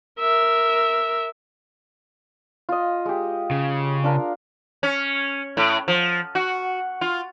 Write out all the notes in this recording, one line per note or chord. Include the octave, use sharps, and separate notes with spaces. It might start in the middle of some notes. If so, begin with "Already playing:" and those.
A#4 E5
F4 D#5
G#3 G4
C#3
D4 F4 A#4
C#4
A2
F3
F#4
F4